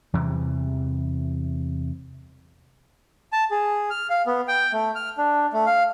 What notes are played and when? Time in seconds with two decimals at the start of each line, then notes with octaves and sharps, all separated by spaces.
0.14 E2 C3 E3 G3
3.32 A5
3.51 G#4
3.90 F6
4.10 F5
4.26 B3
4.48 G5
4.73 A3
4.95 F6
5.18 D4
5.53 A3
5.66 F5